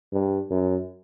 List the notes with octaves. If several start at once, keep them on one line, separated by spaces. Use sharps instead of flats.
G2
F#2